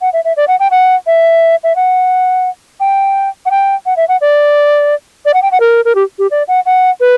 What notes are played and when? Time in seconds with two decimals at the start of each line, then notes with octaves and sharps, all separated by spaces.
0.01 F#5
0.13 E5
0.24 E5
0.37 D5
0.48 F#5
0.60 G5
0.71 F#5
1.07 E5
1.64 E5
1.76 F#5
2.80 G5
3.46 F#5
3.51 G5
3.86 F#5
3.97 E5
4.08 F#5
4.21 D5
5.25 D5
5.34 F#5
5.42 G5
5.52 F#5
5.60 A#4
5.85 A#4
5.95 G4
6.19 G4
6.31 D5
6.48 F#5
6.66 F#5
7.00 B4